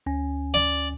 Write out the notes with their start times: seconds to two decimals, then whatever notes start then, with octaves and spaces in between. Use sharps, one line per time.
0.06 D2 C#4 G#5
0.54 D5